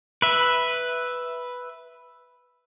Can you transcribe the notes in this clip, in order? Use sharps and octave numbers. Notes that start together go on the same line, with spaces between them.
B4 E5